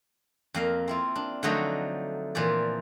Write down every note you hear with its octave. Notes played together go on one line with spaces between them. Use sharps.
F2 A#3 F5
C4 E4 F4
D4
D3 F3 F#3 A3 D#4 D#5
A#2 E3 F3 D5